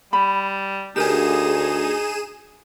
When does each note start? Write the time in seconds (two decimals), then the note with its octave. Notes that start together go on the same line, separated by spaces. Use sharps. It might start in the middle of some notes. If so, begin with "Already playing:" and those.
0.13 G3 B5
0.96 D2 D#4 G4 G#4 A#4 D#7 E7